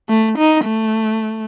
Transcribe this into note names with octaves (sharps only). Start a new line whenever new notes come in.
A3
D#4
A3